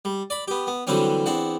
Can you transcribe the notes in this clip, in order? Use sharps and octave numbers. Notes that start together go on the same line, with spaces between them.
G3
D5 B5
B3 G4
B3
D3 E3 F#3 G3 C4 C#4
E2 C4 D4 F#5